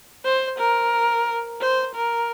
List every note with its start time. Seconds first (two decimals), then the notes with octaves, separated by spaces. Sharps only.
0.24 C5
0.59 A#4
1.60 C5
1.95 A#4